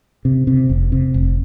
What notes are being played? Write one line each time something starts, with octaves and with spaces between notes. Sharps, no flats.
C3
C3
F1
C3
F1